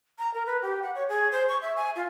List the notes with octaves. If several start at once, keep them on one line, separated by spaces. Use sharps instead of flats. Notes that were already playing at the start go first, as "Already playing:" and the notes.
A#5
A#4
B4
G4
F#5
C#5
G#4
C5
C#6
E5
G#5
F4